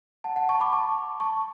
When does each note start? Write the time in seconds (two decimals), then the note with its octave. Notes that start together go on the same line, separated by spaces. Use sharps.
0.24 F#5 A5
0.36 F#5 A5
0.49 A5 C#6
0.60 B5 D6
0.72 A5 C#6
1.20 A5 C#6